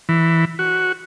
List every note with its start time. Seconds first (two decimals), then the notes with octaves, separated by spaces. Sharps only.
0.09 E3
0.59 F#4